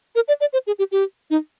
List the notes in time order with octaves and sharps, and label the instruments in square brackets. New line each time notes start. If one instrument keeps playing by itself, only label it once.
[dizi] A#4
D5
D5
C5
G#4
G4
G4
D#4